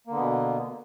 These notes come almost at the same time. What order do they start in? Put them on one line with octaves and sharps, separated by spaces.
A#3 D3 B3 B2